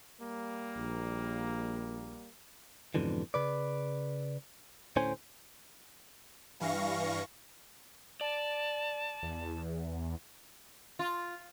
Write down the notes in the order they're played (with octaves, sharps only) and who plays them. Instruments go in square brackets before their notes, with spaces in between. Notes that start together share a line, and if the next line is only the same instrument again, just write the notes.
[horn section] G3 A#3
[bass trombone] A#1
[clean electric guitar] F2 G#2 B2 D3 E3
C#3 B4 D5
D2 A2 C#4 C5 G#5
[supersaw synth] G2 E3 F5 C#6 A#6
[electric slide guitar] D5 [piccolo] A5
[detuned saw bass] E2
[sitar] F4